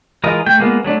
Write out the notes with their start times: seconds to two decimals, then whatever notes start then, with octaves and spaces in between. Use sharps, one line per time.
0.24 E3 G#3 F4 A#4 D#5
0.46 A3 G5
0.59 G#3 A#3 B3 F4
0.84 F#3 A3 D4